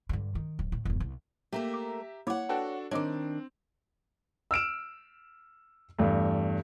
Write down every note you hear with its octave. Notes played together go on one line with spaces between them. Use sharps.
G2 D3
D#3
D1
A2
E1 F#2
C2
A3 A#3 G4 A#4 E5 A#5
D6
A#3 E4 C#5 F#5 D6
D4 F#4 A4 B4 G5 A5
D#3 C4 D4 C#5 D#5 D6
E6 F6 D7 E7
E2 G2 A3